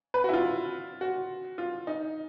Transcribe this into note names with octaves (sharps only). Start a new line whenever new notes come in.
B4
F#4
E4
F4
F#4
F4
D#4